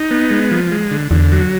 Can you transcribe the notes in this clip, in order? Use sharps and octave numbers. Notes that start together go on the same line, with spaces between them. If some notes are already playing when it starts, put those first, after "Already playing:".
Already playing: D#4
B3
G#3
F3
G#3
D3
E2 D3
F#3